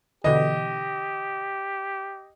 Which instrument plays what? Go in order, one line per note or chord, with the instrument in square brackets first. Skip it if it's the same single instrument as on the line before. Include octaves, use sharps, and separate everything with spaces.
[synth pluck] B2 D3 E3 [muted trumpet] G4 [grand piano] D#5